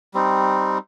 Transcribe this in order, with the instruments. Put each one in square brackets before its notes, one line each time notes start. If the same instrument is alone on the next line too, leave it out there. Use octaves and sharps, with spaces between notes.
[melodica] G3 C4 D#4